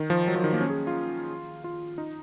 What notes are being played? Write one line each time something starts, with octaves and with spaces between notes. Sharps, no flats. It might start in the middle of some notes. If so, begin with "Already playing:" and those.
Already playing: D#3
F3
F#3
F3
D#3
A#3
C#4
G#4
F4
F4
D#4